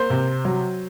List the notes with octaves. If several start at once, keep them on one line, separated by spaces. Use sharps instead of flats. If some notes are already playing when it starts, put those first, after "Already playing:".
Already playing: A#3 C5
C3
F#3